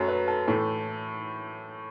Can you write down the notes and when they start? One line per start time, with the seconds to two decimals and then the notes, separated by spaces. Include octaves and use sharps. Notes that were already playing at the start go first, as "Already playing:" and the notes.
Already playing: F#2 F#3 A3
0.08 B4
0.28 A4
0.48 A2 E3 A3 A4